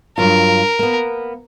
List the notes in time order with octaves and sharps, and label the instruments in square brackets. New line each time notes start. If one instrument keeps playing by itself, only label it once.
[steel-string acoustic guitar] G2 F#3 F4 [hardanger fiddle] A#4
[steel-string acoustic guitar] A#3 B3